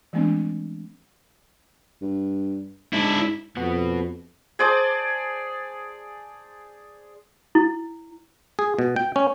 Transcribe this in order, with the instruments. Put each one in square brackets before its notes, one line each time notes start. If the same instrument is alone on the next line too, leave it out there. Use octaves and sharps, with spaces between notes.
[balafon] E3 G#3 A3 B3 C4 D4
[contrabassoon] G2
[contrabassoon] G#2 [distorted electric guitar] D4 E4
[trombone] F2 [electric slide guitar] B3 F#4
[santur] G#4 C5 D5 A5
[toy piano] E4
[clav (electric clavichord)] G#4
B2
G5
C#4